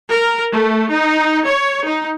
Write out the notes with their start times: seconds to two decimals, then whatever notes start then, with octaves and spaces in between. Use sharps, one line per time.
0.13 A#4
0.55 A3
0.91 D#4
1.46 C#5
1.86 D#4